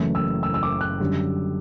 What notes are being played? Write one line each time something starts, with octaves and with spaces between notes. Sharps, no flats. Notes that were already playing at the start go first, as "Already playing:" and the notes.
Already playing: F#1 F#2 E3 A3 E4
E6
E6
E6
D6
F#6
F#2 D3 G3